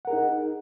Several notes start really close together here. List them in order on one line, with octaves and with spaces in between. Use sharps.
F#5 A#4 G#4 D#4